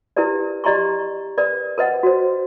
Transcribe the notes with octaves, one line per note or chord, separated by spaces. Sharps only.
E4 G4 A#4 B4 D5
G4 D5 D#5 A#5 C6 C#6
A#4 B4 D5
A#4 B4 D#5 F#5
F#4 C5